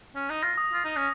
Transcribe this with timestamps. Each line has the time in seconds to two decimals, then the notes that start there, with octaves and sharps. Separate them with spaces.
0.15 C#4
0.30 D#4
0.43 F4 A#6
0.58 D#6
0.73 F4
0.85 D#4
0.96 C#4